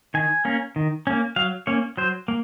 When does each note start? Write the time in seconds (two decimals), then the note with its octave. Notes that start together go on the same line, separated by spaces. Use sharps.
0.14 D#3 G#5
0.45 A#3 C#4
0.76 D#3
1.07 A#3 C#4
1.36 F#3 F5
1.67 A#3 C#4 C#5
1.97 F#3 C5
2.28 A#3